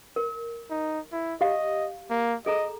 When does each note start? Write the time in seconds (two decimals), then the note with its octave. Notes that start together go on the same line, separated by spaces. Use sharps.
0.16 A#4
0.70 D#4
1.12 E4
1.41 G4 D#5 F5
2.10 A#3
2.46 G#4 A4 D#5 A#5